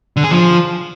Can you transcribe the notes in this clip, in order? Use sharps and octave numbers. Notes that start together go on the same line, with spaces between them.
D3
G#4
F3